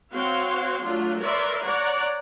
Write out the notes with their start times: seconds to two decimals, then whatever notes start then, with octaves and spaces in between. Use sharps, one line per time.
0.11 C4 F#4 C#5 F5 C6
0.82 F#3 A3 D4 F4
1.18 A#4 B4 C#5 D5 E5 C6
1.62 C#5 D5 F#5 A#5